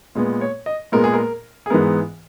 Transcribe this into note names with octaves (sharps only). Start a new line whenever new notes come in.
A#2 G#3 B3
C#5
D#5
A#2 G#3 B3 A#4
G#4
A#4
G#4
G#2 E3 G#3 B3 A#4